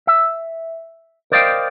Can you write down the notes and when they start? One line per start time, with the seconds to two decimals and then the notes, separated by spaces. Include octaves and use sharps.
0.07 E5
1.32 A#4 C5 D5 D#5 F5 G5